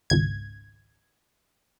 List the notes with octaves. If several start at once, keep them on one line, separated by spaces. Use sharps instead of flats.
G#1 C#2 G#6